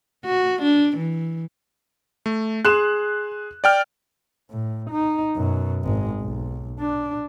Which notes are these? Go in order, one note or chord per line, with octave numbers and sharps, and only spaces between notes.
F#4
D4
E3
A3
G#4 C6 F#6 E7
D5 G5 F6
A2
D#4
F#2 B2
G#1 G#3
B1
D4